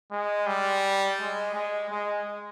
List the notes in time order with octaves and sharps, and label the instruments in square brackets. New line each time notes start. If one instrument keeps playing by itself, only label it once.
[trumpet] G#3
G3
G#3
G#3
G#3